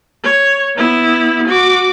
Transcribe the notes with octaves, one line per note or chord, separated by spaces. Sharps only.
C#5
B3 E4
F#4 D6